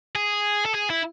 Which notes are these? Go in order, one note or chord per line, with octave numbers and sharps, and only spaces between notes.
G#4
A4
G#4
E4